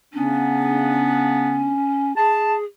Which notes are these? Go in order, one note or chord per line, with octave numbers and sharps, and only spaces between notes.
C#3 B3 C#4 D4
G#4 A5